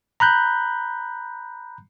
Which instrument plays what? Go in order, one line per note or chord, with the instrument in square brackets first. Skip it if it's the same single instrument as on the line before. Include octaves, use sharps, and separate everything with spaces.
[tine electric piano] A#5 B5 F#6 G6